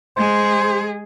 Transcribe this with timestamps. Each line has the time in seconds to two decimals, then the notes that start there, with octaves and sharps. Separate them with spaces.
0.17 G#3 G#4 C5